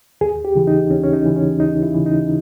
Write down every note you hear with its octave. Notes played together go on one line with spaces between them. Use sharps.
D#2 G#4
G4
C#3 E3
D#4
D#2 C#4
C#4
D#4
C#3 E3
C#4
D#2 D#4
E4
C#3 E3
D#4